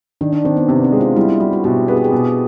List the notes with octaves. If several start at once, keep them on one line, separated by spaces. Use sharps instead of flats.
D#3 D4
D4
D#3 C4
B3
C3 B3
C4
G#3
F4
G3 E4
E4
G3 F#4
F#4
B2 G4
B3 G#4
G4
G#4
B2